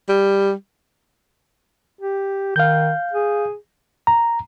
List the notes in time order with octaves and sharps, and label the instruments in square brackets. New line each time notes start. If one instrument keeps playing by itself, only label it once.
[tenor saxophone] G3
[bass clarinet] G4
[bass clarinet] D#3 [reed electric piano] F5 G6
[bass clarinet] G#4
[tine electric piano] A#5